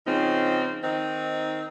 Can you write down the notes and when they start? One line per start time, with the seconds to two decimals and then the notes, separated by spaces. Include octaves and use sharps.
0.07 C#3 F3 C4 D#4
0.83 D#3 C4 D#4